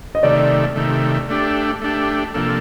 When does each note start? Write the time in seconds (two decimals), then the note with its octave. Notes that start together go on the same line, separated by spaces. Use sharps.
0.15 D#5
0.23 C3 D#3 A3 D5
0.76 C3 D#3 A3
1.29 A3 D4 G4
1.82 A3 D4 G4
2.34 C3 F3 A#3 D4 A4